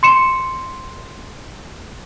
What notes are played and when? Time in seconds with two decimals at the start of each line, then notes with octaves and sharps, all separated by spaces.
0.03 C6 C#7 E7